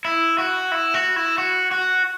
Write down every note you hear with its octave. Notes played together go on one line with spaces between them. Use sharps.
E4
F#4
E4
F#4
E4
F#4
F#4